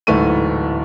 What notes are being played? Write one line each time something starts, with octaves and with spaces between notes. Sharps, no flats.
D1 G#2 E3 A3 C#6 D#7